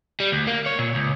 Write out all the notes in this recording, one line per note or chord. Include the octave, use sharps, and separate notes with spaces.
G3
D2
A#3
C#5
A#2
C#2